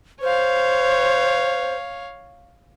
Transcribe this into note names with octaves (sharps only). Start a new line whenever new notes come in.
C5 C#5 F5